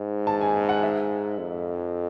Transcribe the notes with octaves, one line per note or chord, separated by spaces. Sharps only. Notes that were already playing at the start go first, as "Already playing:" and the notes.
Already playing: G#2
A5
G#5
F#5
E5
F2